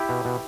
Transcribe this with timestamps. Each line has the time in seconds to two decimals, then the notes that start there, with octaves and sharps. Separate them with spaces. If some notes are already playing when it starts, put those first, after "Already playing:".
Already playing: E4 G4
0.09 B2
0.25 B2